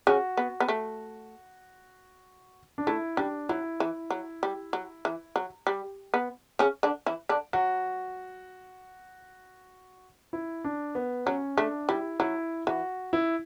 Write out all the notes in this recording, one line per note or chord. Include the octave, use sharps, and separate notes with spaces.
C#3 C#4 F#4
B3
B3
A3
D4
A3 E4
G3 D4
F#3 E4
E3
F#3
G3
F#3
E3
F#3
G3
B3
C#3 C#4
D3 D4
E3 E4
D3 D4
F#3 F#4
E4
D4
B3
F#3 C#4
A3 D4
G3 E4
F#3 E4
E3 F#4
E4